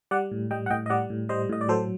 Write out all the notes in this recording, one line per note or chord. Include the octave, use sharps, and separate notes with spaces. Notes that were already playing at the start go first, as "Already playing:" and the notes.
G3 D5 F#5
A2
G3 D#5 G5
F#5
A2 D#5 G5
D#5
G3 D5 F#5
A2
G3 C5 D#5
A2 D#5
D5
F#3 A4 C5